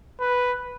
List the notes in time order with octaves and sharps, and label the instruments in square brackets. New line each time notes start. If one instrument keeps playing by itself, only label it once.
[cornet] B4